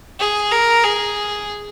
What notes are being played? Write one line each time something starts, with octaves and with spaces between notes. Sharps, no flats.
G#4
A#4
G#4